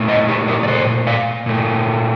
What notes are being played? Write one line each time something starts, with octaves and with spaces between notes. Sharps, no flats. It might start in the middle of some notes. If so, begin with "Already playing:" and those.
Already playing: A#2 A3
C5 D#5
D#4 G4
G4 A#4
D5
A4 C5
D5 F5
A#2 A3